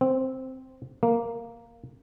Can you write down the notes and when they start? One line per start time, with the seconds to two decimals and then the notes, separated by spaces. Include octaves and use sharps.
0.01 C4
1.03 A#3